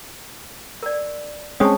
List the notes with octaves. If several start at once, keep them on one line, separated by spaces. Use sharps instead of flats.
A#4 D5
G#3 C4 C#4 A5 C#6 D#6